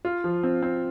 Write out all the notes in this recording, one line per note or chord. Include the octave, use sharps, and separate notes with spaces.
F4
F3
C4
C4